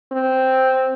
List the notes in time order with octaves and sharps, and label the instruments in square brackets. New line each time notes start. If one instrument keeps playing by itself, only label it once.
[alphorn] C4